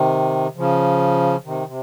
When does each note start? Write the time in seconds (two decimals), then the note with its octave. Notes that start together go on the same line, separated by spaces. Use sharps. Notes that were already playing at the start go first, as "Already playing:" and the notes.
Already playing: C3 D#3
0.56 C#3 F3
1.45 C3 D#3
1.67 C3